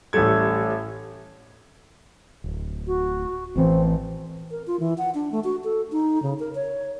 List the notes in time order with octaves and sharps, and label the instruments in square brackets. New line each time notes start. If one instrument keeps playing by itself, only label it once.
[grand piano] A1 G3 A3 A4 G#6
[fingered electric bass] D1
[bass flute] F#4
[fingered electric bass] A1 E3 [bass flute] C4
[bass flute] A#4
F4
E3
F#5
D4
A3
F#4
A4
D#4
C#3
A#4
C#5